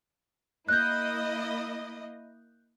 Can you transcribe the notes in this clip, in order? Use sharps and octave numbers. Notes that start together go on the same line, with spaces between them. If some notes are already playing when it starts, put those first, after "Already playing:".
A#3 E4 D#5 F#6 G6